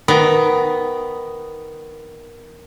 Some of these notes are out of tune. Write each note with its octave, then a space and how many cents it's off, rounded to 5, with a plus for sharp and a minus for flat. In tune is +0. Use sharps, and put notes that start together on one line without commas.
D#3 +0 B3 +5 A#5 +30